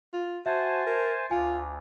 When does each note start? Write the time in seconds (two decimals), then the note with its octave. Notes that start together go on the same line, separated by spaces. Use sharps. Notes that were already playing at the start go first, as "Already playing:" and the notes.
0.13 F4
0.46 F#4 C5 E5 G#5 A5
0.86 A#4
1.31 D2 F4 G#5